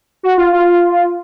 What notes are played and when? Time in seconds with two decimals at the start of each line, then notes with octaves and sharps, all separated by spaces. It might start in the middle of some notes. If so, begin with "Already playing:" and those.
0.23 F#4
0.38 F4
0.53 F4